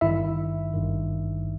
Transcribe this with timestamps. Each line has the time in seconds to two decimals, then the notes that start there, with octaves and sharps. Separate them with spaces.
0.01 G#1 G2 D#3 E4 E5
0.74 G#1 G2 D#3